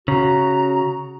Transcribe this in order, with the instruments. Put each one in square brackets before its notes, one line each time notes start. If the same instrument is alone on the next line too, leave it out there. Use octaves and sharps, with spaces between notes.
[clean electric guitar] C#3 [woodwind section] F#4 [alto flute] A#5